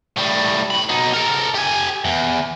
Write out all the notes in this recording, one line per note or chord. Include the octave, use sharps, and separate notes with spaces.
A2 G3
A2 B5
B2 D#4
A4 A#4
G4 G#5
E2